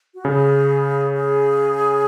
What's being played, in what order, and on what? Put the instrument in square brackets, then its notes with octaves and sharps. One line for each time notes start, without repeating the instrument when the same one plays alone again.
[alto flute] F#4
[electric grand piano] C#3 [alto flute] G#4
[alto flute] G#4